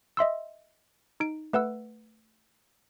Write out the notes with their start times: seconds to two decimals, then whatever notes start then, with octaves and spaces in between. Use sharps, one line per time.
0.17 D#5 E5 C6 E6
1.20 D#4 D7
1.53 A3 B4 F#5 E6